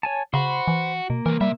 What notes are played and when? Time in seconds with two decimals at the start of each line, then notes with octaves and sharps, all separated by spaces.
0.03 C#5 G#5 A5
0.34 C#3 F#4 C5 B5 C6
0.68 E3
1.10 B2 A#3
1.26 C2 E3 A#4
1.41 C3 G3 E5